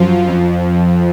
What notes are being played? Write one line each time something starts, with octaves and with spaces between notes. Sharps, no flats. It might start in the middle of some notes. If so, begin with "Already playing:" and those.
Already playing: F#2 F3 F4
F2 F3